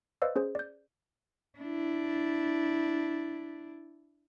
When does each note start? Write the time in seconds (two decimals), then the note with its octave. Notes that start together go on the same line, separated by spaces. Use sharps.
0.22 B4 C5 D5 D#5 F5 E6
0.36 C#4 G#4 C5
0.55 D5 G6
1.59 D4 E4